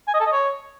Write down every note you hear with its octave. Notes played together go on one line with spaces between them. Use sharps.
G#5
D#5
A4
D#5
C#5